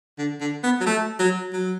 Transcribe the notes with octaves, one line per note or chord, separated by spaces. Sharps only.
D3
D3
B3
F#3
A3
F#3
F#3